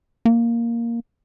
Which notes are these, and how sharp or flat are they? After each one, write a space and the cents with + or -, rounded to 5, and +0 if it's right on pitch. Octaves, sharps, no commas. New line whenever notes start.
A#3 +0